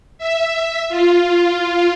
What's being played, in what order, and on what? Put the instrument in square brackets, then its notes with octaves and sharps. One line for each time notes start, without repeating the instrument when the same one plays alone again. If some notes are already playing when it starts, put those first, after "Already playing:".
[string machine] E5
F4